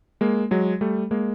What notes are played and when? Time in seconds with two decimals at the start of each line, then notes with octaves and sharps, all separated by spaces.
0.21 G#3 A#3
0.51 F#3 G#3
0.81 G3 A3
1.11 G#3 A#3